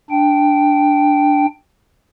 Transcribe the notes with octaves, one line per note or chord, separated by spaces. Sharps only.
D4 G5